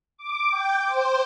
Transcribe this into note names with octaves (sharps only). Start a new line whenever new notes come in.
D6
G5
C5